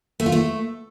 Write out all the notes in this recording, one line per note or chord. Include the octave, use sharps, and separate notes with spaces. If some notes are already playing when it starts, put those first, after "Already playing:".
A3
F4
A3